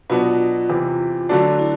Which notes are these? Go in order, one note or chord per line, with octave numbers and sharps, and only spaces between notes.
B2 F#3 B3 D4 F4 F#4
E2 C3 E3
D3 F#3 A3 D4 F#4
E4